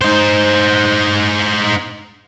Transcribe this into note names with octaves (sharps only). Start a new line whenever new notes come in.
D#4 C5